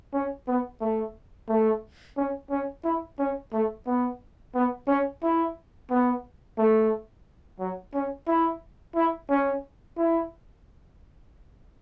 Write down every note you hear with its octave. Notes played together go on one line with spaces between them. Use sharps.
C#4
B3
A3
A3
C#4
C#4
E4
C#4
A3
B3
B3
C#4
E4
B3
A3
F#3
C#4
E4
E4
C#4
E4